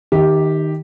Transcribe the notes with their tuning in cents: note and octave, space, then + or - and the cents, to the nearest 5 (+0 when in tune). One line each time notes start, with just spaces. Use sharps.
D#3 +0 G4 +0 E5 -40